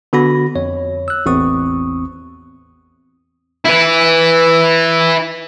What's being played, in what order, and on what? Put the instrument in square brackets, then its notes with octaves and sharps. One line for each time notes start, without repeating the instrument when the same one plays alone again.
[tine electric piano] D3 B3 F#4 B5 A#6
F2 C#5
E6 F#6
A1 E2 C4 C#6 D#6
[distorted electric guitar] E4 B4